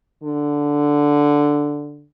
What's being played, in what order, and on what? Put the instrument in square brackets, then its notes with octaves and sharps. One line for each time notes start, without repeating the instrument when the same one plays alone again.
[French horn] D3